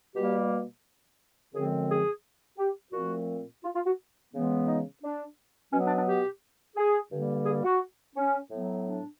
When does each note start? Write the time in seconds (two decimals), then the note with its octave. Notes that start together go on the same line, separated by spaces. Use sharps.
0.15 B2 G3 A#3 G4
1.54 F#2 D3 F3 G#3 C4 G#4
1.89 G#4
2.58 G4
2.93 A#2 F3 A3 C4 F#4
3.63 F4
3.75 F4
3.86 F#4
4.33 C#3 E3 G#3 B3
4.67 D#4
5.02 D4
5.72 B2 F#3 B3 C#4
5.84 D4
5.95 D4
6.07 G4
6.76 G#4
7.11 G2 D3 G3 A#3
7.46 G#4
7.63 F#4
8.16 C#4
8.51 A2 F#3 B3
8.85 D4